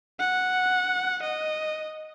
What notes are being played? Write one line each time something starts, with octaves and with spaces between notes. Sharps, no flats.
F#5
D#5